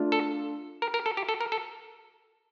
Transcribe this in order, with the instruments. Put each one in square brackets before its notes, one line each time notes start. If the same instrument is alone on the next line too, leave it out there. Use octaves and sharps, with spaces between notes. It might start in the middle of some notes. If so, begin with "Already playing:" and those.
Already playing: [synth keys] A3 D4 F4
[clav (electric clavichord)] A4
A#4
A#4
A4
G4
A4
A#4
A4